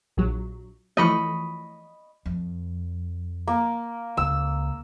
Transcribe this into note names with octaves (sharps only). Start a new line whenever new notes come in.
A#1 F#3
E3 F3 A3 D#5 B5 C#6
F2
A#3
C#2 E6